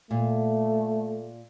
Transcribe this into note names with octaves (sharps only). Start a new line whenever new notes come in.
A#2 A3